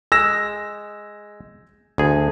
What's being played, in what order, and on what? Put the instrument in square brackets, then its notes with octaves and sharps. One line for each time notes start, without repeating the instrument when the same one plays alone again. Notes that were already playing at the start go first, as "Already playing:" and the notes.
[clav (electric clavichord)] G#3 [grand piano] E6 A#6 E7
[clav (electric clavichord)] D2 G#4